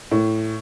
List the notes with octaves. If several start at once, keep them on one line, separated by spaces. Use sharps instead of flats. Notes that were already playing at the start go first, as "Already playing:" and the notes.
A2